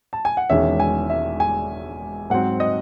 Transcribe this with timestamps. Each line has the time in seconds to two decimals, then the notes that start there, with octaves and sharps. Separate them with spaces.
0.13 A5
0.25 G#5
0.37 F#5
0.50 E1 E2 D#3 G#3 C#4 E5
0.80 G#5
1.10 E5
1.40 G#5
2.30 G#2 F#3 C4 F#5
2.60 D#5